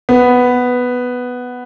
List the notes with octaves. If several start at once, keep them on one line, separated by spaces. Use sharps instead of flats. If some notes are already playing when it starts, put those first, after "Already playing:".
B3